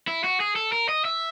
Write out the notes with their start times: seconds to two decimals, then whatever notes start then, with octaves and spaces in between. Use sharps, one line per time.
0.08 E4
0.24 F#4
0.40 G#4
0.56 A4
0.72 A#4
0.89 D#5
1.05 E5